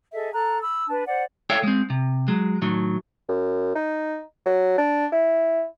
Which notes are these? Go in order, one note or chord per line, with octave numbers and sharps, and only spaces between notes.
G#4 A4 D#5 E5
A4 A#5 F#6
B5 E6
D4 B4 A5
C5 D5 F#5
A4 C#5 E5 F5 G5
G#3 C4
C3
F#3 G#3
A2 D#3 F#3
F#2
D#4
F#3
D4
E4